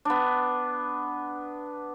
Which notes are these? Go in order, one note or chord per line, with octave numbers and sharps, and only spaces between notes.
B3 D4